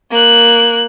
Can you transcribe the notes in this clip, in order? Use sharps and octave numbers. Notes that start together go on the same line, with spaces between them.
A#3 F#6